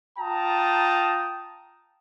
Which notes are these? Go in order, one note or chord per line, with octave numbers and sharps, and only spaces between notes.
F4 G5 A5 A#5 D#6